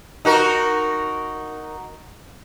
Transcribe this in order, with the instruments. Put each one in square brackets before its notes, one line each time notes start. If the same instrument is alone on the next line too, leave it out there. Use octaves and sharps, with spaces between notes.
[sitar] D#4 F#4 A#4